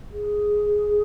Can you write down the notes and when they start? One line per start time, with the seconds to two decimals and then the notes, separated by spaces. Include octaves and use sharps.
0.12 G#4